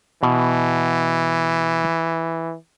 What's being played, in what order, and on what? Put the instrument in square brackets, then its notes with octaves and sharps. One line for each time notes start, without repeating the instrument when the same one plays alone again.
[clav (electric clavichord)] B2 [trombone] E3